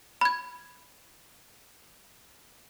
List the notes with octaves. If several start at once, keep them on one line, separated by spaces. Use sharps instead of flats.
B5 G#6